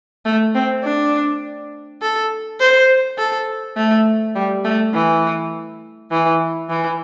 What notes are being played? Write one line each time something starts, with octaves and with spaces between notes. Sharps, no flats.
A3
C4
D4
A4
C5
A4
A3
G3
A3
E3
E3
E3